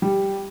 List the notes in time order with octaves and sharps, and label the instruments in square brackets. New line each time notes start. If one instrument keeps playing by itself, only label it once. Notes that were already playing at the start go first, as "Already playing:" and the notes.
[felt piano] G3